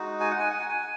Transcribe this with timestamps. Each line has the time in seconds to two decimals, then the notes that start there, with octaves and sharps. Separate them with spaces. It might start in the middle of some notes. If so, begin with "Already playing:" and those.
Already playing: G#3 D#4 F#4
0.20 G#5
0.31 F#5
0.40 G#5
0.50 F#5
0.59 G#5
0.69 G#5